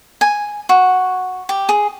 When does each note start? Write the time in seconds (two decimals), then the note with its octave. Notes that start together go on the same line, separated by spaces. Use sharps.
0.21 G#5
0.69 F#4
1.49 G4
1.69 G#4